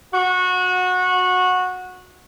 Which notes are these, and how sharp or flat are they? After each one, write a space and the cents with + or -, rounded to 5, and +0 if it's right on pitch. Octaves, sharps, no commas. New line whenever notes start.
F#4 -20